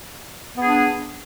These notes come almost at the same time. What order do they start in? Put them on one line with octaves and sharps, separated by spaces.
B3 G#4 D4